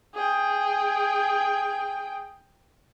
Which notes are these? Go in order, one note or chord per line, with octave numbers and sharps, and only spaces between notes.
G#4 G5